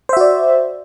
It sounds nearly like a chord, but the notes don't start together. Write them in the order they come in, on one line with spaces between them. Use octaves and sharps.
C5 E5 F#4 D5